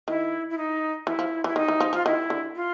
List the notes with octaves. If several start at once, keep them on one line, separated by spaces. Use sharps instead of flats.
D#3 E4
E4
D#4
E3 E4
F3
E3 E4
D#3 D#4
E3
F3
F3 F4
D#3 E4
D3
F4